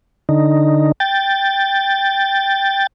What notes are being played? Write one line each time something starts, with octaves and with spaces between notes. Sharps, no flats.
D3 D#4
G5 A6